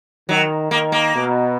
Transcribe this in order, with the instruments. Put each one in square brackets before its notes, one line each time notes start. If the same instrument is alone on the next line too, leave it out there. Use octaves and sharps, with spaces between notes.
[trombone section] D#3 [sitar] F#3
[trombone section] D#3 [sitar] A#3
[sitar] A#3
[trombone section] B2